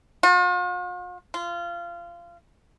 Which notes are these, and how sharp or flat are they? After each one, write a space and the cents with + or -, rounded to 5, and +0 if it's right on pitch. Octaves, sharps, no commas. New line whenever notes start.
F4 +45
F4 -20